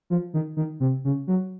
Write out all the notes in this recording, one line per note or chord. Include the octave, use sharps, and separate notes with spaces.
F3
D#3
D#3
C3
C#3
F#3